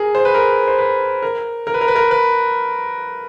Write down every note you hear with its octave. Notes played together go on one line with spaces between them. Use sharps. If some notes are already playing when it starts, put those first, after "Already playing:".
Already playing: G#4 A#4
C5
B4
A#4
C5
B4
A#4
A#4
B4
A#4
B4
A#4
B4